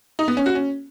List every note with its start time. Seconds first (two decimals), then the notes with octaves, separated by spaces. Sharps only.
0.19 D#4
0.28 B3
0.37 C#4
0.46 F#4
0.55 C#4